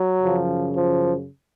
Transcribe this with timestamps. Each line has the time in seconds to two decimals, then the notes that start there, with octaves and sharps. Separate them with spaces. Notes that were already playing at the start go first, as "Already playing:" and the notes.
Already playing: F#3
0.22 F#2 C#3 F3
0.75 F3